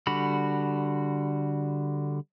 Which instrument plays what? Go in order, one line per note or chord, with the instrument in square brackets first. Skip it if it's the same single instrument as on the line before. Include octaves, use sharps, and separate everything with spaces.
[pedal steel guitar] D3 G3 F#4 B5